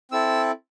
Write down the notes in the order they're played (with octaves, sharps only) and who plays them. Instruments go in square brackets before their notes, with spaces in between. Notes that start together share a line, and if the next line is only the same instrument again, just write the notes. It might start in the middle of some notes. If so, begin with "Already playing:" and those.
[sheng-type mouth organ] C4 E4 A4 E6